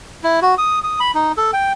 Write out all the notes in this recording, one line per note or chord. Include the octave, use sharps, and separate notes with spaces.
E4
F#4
D#6
D#6
B5
D#4
A4
G5